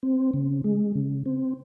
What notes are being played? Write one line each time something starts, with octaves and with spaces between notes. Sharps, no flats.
C4
C#3
G#3
C#3
C4